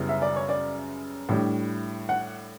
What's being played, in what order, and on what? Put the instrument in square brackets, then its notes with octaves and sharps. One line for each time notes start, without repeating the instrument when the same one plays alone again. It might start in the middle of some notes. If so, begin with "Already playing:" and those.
Already playing: [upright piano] F#2 C#3 G3 B3 E4
E5
D5
C#5
D5
A2 G3 D4
F#5